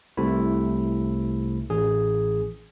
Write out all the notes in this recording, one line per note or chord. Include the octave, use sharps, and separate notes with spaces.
C2 C3 A3 E4
A1 G#4